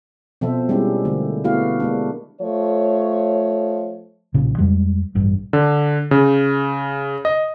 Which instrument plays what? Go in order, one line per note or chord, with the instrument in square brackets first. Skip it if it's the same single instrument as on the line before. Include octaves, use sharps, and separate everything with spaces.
[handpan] B2 F3 C4 A4 C5 E5
G3 G#3 C4 C#4 E4 G4
D3 A3 A#3
A3 B3 E4 F#4 G4 F5
G#3 A#3 D4
[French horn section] F3 A3 C#5
[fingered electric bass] B1 A#2 C#3
F2 G3 G#3
A1 G2
[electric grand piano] D3
C#3
D#5